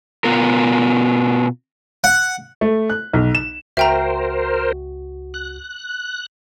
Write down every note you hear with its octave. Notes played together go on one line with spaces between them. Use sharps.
B2 B3 F4 A#4
F#5
A3
F#6
B1
E7
C#2 F#4 A#4 C5 E5 G5 A#5
F#6